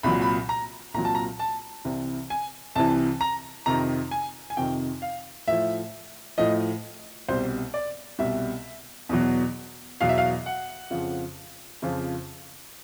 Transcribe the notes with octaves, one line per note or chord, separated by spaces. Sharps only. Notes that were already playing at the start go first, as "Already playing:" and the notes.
C2 A#2 F#3 B5
B5
A#5
C2 A#2 F#3 A#5
A5
A#5
A5
C2 C3 E3
G#5
C2 C3 E3 A5
A#5
F2 C3 D#3 A#5
G#5
G#5
F2 C3 D#3 G5
F5
A2 F3 E5
A2 F3 D#5
C2 B2 G3 C5
D5
C2 B2 G3 E5
E2 B2 F#3
E2 B2 F#3 F5
E5
F5
F#5
F2 C#3 F3
F2 C#3 F3